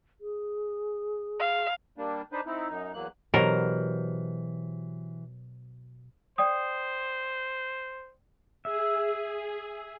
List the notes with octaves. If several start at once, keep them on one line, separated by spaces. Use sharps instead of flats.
G#4
F5
G3 A#3 D4
D4 D#4 B4 C5
C4 D#4 E4
F#2 D#4
E2 F#3 A#3 F#6
B2 E3 F#3 G4 A#4 C5
C5 D5 G5 D#6
G#4 E5